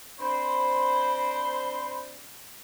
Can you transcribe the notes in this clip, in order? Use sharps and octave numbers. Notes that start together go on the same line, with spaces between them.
C4 D4 C5 B5